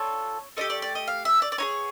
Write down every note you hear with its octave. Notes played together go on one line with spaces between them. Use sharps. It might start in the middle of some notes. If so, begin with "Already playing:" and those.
Already playing: D4 F4 A4 C#5
A3 D4 G4 D#5
D5
D5
D#5
F5
E5
D5
D5
B3 D#4 G#4 C#5